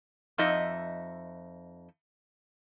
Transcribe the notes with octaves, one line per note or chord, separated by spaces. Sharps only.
F2 D#4 D#5 E5